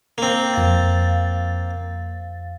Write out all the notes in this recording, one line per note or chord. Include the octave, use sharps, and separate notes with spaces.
A#3 C4
F2 F5 A6